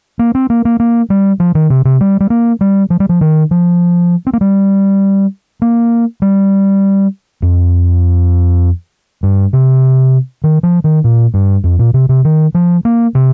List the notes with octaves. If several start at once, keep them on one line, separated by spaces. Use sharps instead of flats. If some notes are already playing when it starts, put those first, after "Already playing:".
A#3
C4
A#3
A#3
A#3
G3
F3
D#3
C3
C3
G3
G3
A#3
G3
F3
G3
F3
D#3
F3
C4
A#3
G3
A#3
G3
F2
G2
C3
D#3
F3
D#3
A#2
G2
F2
A#2
C3
C3
D#3
F3
A#3
C3